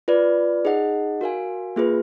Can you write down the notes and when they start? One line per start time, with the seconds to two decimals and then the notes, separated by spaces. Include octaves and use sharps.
0.08 F4 B4 D5
0.65 D#4 G#4 D#5 F#5
1.21 F#4 A#4 F5 G#5
1.76 A#3 F4 G#4 B4